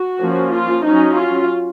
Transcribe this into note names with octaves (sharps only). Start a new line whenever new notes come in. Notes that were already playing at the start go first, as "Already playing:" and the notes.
Already playing: F#4
F3 A#3 C#4
F4
F#3 C#4 D#4
F4